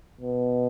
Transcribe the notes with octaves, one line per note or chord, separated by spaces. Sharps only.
B2